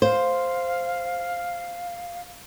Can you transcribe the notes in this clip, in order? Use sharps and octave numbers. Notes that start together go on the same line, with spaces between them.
C5 F5